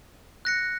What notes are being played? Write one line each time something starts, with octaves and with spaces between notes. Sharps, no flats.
F#6 A#6 C#7